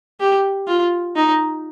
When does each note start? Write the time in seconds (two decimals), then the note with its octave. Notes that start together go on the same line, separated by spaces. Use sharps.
0.20 G4
0.68 F4
1.16 D#4